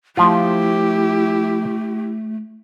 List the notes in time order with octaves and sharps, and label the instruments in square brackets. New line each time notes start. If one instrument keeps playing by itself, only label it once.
[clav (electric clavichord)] F3 F4 [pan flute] A3 [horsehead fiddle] E4 G4